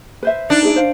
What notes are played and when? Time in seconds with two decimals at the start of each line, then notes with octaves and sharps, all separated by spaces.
0.23 B4 C5 E5
0.50 D4 D#4
0.63 E4 G#4 B4
0.76 C5 F5